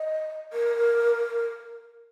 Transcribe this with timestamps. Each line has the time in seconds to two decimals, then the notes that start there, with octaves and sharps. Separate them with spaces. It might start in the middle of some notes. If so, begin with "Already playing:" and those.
Already playing: D#5
0.53 A#4